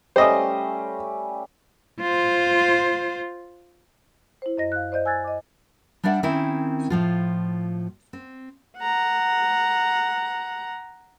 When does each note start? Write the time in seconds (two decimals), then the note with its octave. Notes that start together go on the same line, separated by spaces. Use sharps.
0.16 G3 A3 C#4 C5 D#5 D#6
2.00 F4 C5
4.42 E4 C5
4.58 F#2 D#5 A#6
4.72 F5 F#6
4.92 C5 D5 D#5 G6
5.05 G#5 E6 F#6 G#6 A6
5.24 D#5 D6
6.03 G3 D4 D5 E5 F#5
6.23 D#3 C4 C#4 E4
6.90 A2 F3 F4
8.13 C4
8.79 F#5 A#5